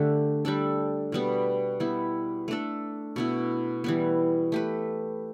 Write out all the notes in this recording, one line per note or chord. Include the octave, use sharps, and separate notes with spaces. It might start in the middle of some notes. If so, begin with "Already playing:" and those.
Already playing: D3 A3 D4 G4
G3 D4 A4
B2 G3 B3
G3 B3 E4
A3 D4 A4
B2 B3 E4
E3 G3 B3
A3 G4 B4